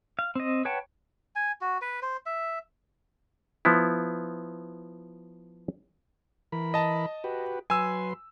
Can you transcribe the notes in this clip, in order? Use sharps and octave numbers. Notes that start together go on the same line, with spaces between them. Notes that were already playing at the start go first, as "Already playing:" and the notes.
F5
C4 D#5
B4 C#5 F#5 G5 A5
G#5
F#4
B4
C5
E5
F3 B3 E4
E3 A#4 B5
D#5 A5
F#4 G4 B4
F#3 B4 G#5 C6 E6